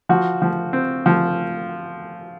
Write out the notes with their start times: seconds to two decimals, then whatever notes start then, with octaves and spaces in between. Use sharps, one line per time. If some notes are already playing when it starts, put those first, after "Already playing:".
0.09 F3 F#4
0.42 F3
0.73 C4
1.06 F3